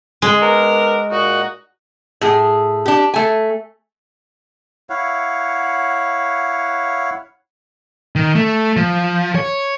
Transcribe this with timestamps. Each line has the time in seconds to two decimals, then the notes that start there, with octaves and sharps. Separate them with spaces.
0.22 G#3
0.40 B3 D4 A#4
1.11 A#2 D#4 F#4
2.21 A2 G#4
2.86 D4 G4
3.14 A3 G#5
4.90 E4 C#5 F5 F#5
8.16 D#3
8.35 A3
8.77 F3
9.35 C#5